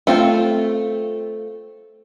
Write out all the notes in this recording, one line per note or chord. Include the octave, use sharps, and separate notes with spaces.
A3 C4 F4